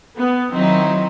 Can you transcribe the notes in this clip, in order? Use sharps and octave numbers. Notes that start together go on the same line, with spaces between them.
B3
D#3 F#3 C4 D#4 E4